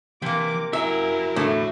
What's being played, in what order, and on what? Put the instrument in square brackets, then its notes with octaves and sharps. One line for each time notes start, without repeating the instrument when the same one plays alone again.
[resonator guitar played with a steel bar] C3 A#3 [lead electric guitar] E3 [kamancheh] D6
[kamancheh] E4 A#4 [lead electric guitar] F#4 G#5 [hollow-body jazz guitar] E5
[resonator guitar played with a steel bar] E2 D3 A3 [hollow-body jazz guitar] A2